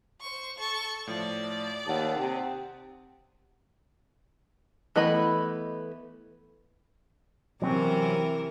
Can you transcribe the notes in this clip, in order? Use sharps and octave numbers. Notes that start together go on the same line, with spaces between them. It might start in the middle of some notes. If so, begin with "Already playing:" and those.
C5 C#6
A4 C#6
A2 F3 D5
D#2 F#5 A5 D#6
C3
E3 A3 B3 D#5 B5
C3 E3 F#3 C4 C#4 A#4